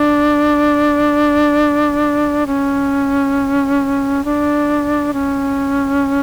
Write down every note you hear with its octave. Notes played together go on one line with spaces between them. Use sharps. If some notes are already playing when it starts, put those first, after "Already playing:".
Already playing: D4
C#4
D4
C#4